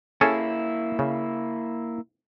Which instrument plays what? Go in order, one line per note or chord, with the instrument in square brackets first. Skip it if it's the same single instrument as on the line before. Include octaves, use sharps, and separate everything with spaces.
[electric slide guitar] A#3 E4 [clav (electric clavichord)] C#4 G#4 A4
[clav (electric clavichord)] C#3